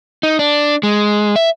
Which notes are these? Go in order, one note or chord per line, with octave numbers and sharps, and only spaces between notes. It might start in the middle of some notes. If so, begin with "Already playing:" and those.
D#4
D4
G#3
E5